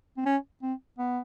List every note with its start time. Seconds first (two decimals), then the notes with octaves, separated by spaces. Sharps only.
0.17 C4
0.26 C#4
0.62 C4
0.98 B3